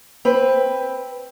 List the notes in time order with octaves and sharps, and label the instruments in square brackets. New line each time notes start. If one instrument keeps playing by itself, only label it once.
[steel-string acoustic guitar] C4 B4